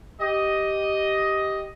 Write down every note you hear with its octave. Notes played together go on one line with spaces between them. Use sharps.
G4 D#5